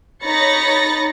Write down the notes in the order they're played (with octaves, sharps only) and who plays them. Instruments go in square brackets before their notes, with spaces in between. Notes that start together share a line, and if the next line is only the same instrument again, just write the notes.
[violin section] D#4 C#5 B5 A6 A#6 C#7